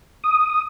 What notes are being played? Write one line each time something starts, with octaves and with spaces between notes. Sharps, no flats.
D#6